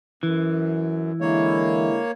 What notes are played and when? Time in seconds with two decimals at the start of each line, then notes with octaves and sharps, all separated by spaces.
0.23 F#2 E3
1.21 D3 G#3 A#3 E4 C#5